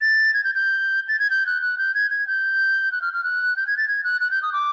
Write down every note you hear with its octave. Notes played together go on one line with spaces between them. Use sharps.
A6
G#6
G6
G6
A6
G#6
G6
F#6
F#6
G6
G#6
G#6
G6
F#6
F6
F6
F#6
G6
G#6
A6
G#6
F#6
F#6
G6
D#6
D6